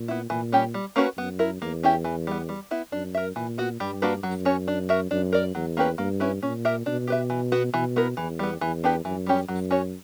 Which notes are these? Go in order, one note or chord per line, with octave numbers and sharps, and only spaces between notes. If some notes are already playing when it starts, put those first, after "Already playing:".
Already playing: A#2
B3 E4
A#2 E3
G3 C#4 G4
G3
A#3 C#4 F#4 B4
F#2 B3
E4 A#4
E2 A#3
C#4 E4 G4
E3
G3 B3
G3
B3 E4
F#2 D4
A#4 E5
A#2 E3
B3 F#4
G2 G3
A#3 D4 F#4 B4
F#2 F#3
C#4 F#4 C#5
D4
F#4 A#4 E5
F#2 D4
A#4 D5
E2 F#3
A#3 C#4 G4 B4
G2 A#3
C#4 E4 B4
A#2 C#4
G4 A#4 E5
B2 D4
G4 B4 E5
E3
B3 F#4
B2 E3
B3 E4 A#4
E2 E3
G3 B3
E2 E3
B3 D4 G4 B4
F#2 E3
G3 C#4 G4
F#2 F#3
C#4 F#4 C#5